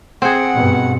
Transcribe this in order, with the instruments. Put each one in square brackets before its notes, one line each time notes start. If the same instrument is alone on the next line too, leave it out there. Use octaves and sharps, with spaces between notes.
[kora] C4 G#4 [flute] F#5
[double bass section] G2 B2